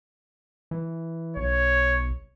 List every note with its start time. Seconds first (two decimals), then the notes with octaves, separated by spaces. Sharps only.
0.71 E3
1.37 B1 C#5